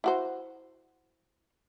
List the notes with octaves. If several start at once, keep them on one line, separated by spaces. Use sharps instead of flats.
E4 F#4 C5